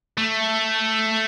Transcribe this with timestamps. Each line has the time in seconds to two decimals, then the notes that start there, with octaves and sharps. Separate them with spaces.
0.18 A3